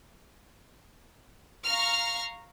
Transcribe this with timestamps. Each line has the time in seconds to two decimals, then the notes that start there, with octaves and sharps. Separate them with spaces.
1.65 F5 A#5 C#6 F6